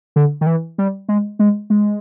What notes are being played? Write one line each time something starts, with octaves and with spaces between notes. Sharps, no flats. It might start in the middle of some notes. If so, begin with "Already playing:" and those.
D3
D#3
E3
G3
G#3
G#3
G#3